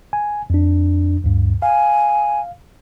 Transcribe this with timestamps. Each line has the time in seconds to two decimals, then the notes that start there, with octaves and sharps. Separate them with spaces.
0.13 G#5
0.50 F2 D4
1.24 D2 G2
1.62 F5 G#5